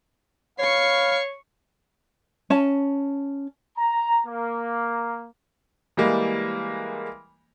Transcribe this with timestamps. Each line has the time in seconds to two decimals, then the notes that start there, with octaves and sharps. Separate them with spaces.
0.59 B4 C#5 F5 C#6 C7
2.50 C#4 A5
3.77 A#5
4.26 A#3
5.97 E3 G3 G#3 A#3